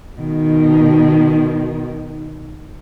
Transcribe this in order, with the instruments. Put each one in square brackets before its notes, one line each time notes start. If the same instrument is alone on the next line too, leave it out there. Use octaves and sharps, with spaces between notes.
[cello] B2 D#3